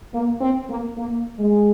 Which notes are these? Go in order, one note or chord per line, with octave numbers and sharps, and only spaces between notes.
A#3
C4
A#3
A#3
G#3